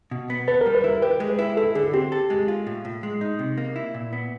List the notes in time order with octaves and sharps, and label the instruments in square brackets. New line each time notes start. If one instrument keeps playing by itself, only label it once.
[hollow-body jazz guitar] B2
B3
[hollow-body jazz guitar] A4 [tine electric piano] B4
[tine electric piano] A#4
[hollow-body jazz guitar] G3
[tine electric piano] B4
[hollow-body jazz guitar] E4 [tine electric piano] A#4
[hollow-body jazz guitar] G4 [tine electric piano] B4
[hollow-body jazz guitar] G#3
[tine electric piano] B4
[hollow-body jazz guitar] E4
[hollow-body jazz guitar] E4 [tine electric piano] A4
[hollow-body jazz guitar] D3 [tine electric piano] G#4
[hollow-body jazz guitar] C4 [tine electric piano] G4
[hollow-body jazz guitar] A4
G#3
F4
A2
A2
G#3
D#4
C3
A#3
E4
A#2
B3